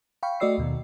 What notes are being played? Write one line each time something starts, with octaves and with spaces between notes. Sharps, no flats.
F5 G5 B5 C#6
A3 F#4 D5 D#5 E6 C7
D#2 B2 D#3